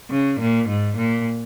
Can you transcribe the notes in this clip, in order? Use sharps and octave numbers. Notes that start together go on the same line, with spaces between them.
C#3
A#2
G#2
A#2